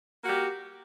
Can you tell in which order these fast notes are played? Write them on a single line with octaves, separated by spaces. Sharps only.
A#3 F#4 G4